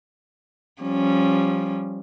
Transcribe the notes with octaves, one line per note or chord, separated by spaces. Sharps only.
F3 G3 C#4